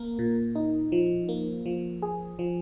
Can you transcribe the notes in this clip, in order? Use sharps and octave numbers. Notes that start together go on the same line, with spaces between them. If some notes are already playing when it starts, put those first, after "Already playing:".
Already playing: A#3 A#4
A#2
D#4
F3
A#3
F3
G#4
F3